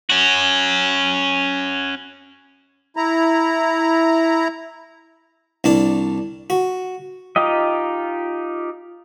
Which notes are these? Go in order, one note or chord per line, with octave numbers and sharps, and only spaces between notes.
C#4 F#4
E4 A#5
C2 D4 D5
F#4
D#4 F4 G4 D#5